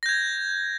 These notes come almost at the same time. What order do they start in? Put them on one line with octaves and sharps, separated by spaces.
A#6 G6 G#6